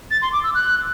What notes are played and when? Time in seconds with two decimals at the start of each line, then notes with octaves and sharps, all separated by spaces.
0.10 A6
0.21 C6
0.32 D6
0.43 E6
0.54 F#6